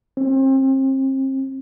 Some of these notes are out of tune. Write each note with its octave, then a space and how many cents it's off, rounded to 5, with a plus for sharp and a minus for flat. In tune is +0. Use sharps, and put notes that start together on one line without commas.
C4 +35